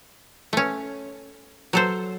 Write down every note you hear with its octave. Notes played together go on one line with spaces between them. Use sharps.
A3 C#4
F#3 A4 C5